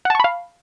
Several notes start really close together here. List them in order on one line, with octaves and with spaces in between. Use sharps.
F#5 A5 C#6 B5 F5